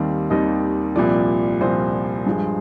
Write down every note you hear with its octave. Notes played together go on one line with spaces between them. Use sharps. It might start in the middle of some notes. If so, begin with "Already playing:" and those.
Already playing: D#2 D#3 G3 C4 F5
D#2 D#3 G3 C4 D#5
C2 A#2 F3 D5
C2 A#2 F3 C5
G2 F3 G#3